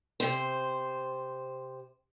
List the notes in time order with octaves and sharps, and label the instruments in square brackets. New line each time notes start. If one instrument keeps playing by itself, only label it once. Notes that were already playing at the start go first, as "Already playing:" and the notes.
[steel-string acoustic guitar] C3 C5